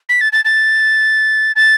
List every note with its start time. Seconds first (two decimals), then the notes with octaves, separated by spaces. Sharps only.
0.09 B6
0.21 A6
0.33 A6
0.45 A6
1.56 A6